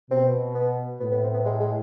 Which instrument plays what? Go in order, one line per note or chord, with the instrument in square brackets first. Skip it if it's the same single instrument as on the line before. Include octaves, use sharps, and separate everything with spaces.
[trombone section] B2 [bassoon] C4
[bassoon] B3
[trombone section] A2 [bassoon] B3
[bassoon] B3
C4
B3
G#3
G#3